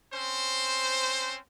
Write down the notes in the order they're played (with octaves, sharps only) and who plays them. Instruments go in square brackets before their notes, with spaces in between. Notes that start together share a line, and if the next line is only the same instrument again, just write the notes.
[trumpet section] C4 C#4 C5